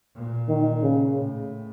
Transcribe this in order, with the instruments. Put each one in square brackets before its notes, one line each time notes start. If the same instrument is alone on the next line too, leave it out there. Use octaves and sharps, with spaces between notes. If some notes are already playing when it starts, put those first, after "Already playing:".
[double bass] A#2
[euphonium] D#3
C#3
[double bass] A2